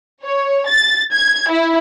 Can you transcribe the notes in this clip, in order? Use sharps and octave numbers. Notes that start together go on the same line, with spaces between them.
C#5
A6
G#6
E4